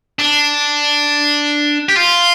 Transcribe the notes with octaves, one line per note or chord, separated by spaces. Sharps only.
D4
G4
F4